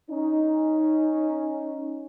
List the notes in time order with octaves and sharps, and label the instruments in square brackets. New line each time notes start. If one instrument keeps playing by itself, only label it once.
[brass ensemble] C#4 D#4